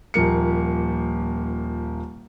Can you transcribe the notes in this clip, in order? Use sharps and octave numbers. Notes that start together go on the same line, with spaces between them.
D#1 F3 A#3 C#7